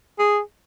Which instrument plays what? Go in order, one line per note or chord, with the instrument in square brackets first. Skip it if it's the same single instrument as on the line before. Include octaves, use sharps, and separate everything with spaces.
[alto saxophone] G#4